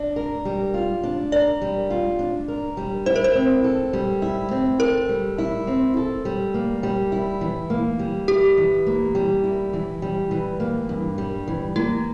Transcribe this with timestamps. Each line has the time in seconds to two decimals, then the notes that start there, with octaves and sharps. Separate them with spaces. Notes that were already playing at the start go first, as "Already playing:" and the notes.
Already playing: D4 D5
0.16 A#4
0.45 G3
0.74 F4
1.03 D4
1.32 A#4 D5
1.62 G3
1.90 F4
2.19 D4
2.48 A#4
2.77 G3
3.06 E4 C5
3.16 A#4
3.24 C5
3.35 C4
3.64 A4
3.93 G3
4.22 E4
4.51 C4
4.80 A4 A#4
5.09 G3
5.38 E4
5.67 C4
5.97 A4
6.25 G3
6.54 A#3
6.83 G3
7.12 E4
7.41 E3
7.70 A#3
7.99 G3
8.28 E4 G4
8.57 E3
8.87 A#3
9.15 G3
9.44 E4
9.73 E3
10.02 G3
10.31 E3
10.60 A#3
10.89 G2
11.18 G3
11.48 E3
11.76 A#3 E4